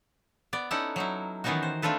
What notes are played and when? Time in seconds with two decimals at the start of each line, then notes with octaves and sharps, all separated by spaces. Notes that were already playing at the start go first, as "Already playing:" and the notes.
0.53 B3 D5
0.71 C#4 D#4 E4 A4 D5 F#5
0.96 F#3 D#4 E4
1.44 D#3 E3 B3 C#4 D#4 F#4
1.63 C5
1.82 A3 C4 D4 F4 A4 B4